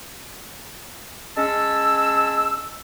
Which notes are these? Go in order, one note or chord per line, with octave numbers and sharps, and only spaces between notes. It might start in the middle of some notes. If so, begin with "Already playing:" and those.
G#3 C#4 A5 E6